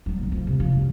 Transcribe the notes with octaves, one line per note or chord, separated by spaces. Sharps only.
F#3 G3
B1 D#3
F2
C3
F3
F#2 C3